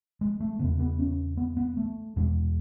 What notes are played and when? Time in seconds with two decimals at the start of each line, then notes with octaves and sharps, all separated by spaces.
0.21 G#3
0.40 A3
0.59 E2 C#3 B3
0.79 B3
0.99 C#4
1.37 B3
1.57 B3
1.77 A3
2.16 E2 B2 G#3